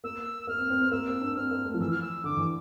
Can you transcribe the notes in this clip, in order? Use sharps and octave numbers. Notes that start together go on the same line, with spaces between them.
A#3 E6
A#3 F6
C4
C4
C4
A#3 E6
C4
D4
C4 F6
A#3
A3
F3
E3 E6
F6
E6
D3 D6
E3